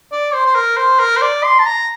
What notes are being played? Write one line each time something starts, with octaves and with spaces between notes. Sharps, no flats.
D5
C5
C5
A#4
C5
A#4
C5
D5
C6
A5
A#5